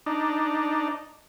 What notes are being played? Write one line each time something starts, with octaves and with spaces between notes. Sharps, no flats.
D4 D#4